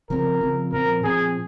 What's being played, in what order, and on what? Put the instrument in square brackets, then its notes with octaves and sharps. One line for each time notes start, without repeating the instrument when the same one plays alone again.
[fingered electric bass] C#3 F3 C4 [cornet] A#4
[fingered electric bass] C#3 F3 C4
[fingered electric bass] A#2 F3 C4 [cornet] A#4
[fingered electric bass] A#2 F3 C4 [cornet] G#4